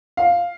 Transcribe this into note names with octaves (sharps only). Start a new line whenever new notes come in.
F5